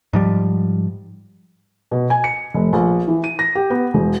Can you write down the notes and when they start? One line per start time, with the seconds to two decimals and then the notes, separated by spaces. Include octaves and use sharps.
0.13 G#2 F3 G3
1.91 B2
2.10 G#5
2.24 C#7
2.54 F1
2.73 A#1
3.08 E3
3.24 D#7
3.39 A#6
3.55 G4
3.70 B3
3.94 E1